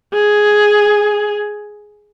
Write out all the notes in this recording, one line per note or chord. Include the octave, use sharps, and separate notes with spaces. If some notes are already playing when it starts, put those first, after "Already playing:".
G#4